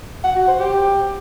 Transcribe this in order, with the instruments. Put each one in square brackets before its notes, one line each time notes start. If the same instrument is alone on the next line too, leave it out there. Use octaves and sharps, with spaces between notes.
[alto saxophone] F#5
F#4
C5
G4